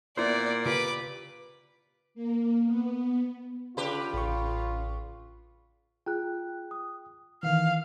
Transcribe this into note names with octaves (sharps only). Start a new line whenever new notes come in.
A#2 B3 E4 C5 D5
C#3 F4 G4 B4 D6
A#3
B3
C#3 F4 G4 B4
A1 C#6
F4 G#4 G5 F#6
D#6
D#3 E3 F5